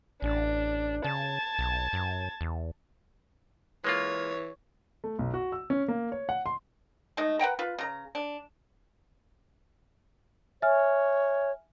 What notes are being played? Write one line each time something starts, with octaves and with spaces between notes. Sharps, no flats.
A1 D4
C#3 A5 G#6
B1
F#2
E2
E3 G#3 A#3 F4 C#5
A3
B1
F#4
E6
C#4
A#3
C#5
F#5
C6
G#3 A3 D#4 D#5
B4 F#5 G5 A#5
F4 B4
C#3 A#5
D4
C#5 E5 G#5 F6